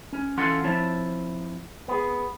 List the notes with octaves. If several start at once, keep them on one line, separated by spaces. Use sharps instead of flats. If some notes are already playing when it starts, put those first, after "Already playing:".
C#4
E3 C#4 F4 A4 F#5 C6
F3 C4 E4 C#5 A5
B3 G#4